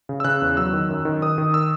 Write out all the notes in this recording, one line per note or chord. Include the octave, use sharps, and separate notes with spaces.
C#3
E6
C#3 F#6
E2
F#3 E6
D#3
F#2
D#3
D#3 D#6
D#3
E6